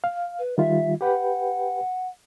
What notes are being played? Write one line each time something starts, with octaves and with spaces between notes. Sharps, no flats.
F5
B4
D#3 G3 F4 E5
G4 B4 F#5 G5